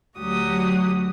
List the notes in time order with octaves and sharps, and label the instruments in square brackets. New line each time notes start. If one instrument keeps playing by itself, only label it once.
[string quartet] D2 F#3 F#4 G4 D#6